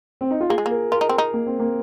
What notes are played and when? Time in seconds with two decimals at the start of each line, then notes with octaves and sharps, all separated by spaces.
0.21 C4
0.31 D#4
0.41 F4
0.49 A#3 G#4
0.58 G#3
0.66 A#3
0.71 A#4
0.92 F4 A#4
1.01 D#4
1.09 C4
1.18 D#4
1.34 A#3
1.46 C4
1.60 A#3